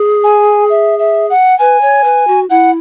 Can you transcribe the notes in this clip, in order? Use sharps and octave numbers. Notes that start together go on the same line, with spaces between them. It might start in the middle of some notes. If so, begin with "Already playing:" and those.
Already playing: G#4
G#5
E5
E5
F#5
B4 G#5
C#5
B4
F#4
E4 F#5